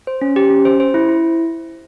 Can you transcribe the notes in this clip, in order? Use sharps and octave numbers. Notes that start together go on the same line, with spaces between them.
C5
C#4
G4
C#4
C5
C5
E4
E4